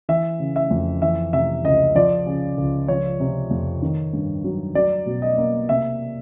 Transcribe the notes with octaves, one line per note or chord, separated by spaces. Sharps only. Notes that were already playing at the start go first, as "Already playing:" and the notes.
E3 E5
C#3
E5
F2
E3 E5
C3 E5
C#2 D#5
F3 D5
C#3
C#2
F3 C#5
C3
F2
D#3
G2
F#3
F#3 D5
B2
D#5
A#3
C3 E5